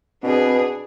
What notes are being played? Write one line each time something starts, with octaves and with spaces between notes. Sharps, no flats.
B2 C4 D4 G#4 B4